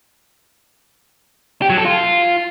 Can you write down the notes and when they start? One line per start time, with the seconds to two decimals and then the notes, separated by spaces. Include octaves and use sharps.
1.62 G4
1.70 F#3
1.78 A4
1.85 F4